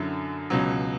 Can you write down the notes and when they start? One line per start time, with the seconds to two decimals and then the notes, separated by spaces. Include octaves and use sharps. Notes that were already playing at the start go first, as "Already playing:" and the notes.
Already playing: F#2 D3 F#3 E4
0.50 C#2 B2 F#3 C#4